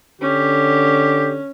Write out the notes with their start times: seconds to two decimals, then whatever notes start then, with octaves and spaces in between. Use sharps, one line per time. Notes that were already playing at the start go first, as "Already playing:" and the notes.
0.21 D3 C#4 G4